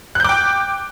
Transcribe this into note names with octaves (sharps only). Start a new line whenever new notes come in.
G5 D6 F#6 G6